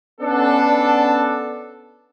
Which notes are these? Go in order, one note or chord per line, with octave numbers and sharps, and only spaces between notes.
B3 C#4 D4 A4